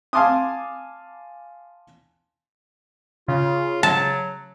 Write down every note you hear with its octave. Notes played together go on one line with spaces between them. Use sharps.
F5 G#5 A5 C6 D6 D#6
C#3 F4
F#3 A5